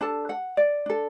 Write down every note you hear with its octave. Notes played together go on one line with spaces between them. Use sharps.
D4 A4 A5
F#5
D5
D4 A4